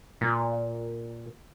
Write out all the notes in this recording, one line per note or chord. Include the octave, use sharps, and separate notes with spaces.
A#2